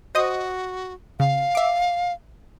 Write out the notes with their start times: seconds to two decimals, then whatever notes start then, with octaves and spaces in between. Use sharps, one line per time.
0.15 F#4 C5 D#5 D#6
1.20 C#3 F5
1.55 E5 D6